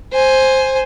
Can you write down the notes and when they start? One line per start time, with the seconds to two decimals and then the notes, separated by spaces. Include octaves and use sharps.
0.12 C5 G#5